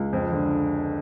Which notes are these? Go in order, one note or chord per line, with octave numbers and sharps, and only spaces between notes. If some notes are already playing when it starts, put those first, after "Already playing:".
Already playing: C#2
F2
D3